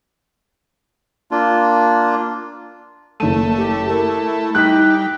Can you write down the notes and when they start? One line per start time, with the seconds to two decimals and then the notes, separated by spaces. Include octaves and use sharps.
1.31 A#3 D4 F4
3.20 F#1 A3 D#7
3.58 G4
3.89 E4 A#4
4.55 G3 D#4 F#6 B6